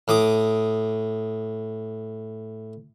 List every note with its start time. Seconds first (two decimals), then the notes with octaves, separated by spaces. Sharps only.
0.08 A2 D6 D#6